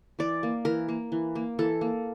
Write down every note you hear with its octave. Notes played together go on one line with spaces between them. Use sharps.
E3 D5
A#3
E3 A#4
A#3
E3
A#3
E3 A4
A#3